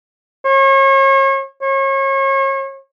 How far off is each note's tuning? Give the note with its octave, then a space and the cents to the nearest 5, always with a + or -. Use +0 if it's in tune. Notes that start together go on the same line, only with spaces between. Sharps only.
C#5 -40
C#5 -35